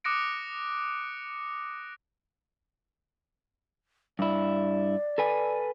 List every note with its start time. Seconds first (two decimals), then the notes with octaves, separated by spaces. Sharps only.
0.04 D6 D#6 F#6 A#6 C#7 D7
4.19 G2 E4 D5
5.18 A4 B4 G#5